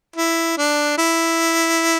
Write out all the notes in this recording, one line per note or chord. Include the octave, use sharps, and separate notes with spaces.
E4
D4
E4